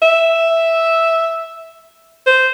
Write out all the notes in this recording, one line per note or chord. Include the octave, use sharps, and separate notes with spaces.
E5
C5